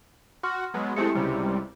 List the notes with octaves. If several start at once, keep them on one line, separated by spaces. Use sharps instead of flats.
F#4 C6 F6
F#3 G#3 B3
G#3 A3 C4 E4 G4 C#7
C#2 C3 G3